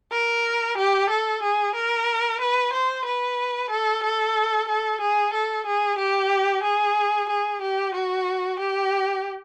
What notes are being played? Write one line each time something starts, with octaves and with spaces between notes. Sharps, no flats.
A#4
G4
A4
G#4
A#4
B4
C5
B4
A4
A4
A4
G#4
A4
G#4
G4
G#4
G#4
G4
F#4
G4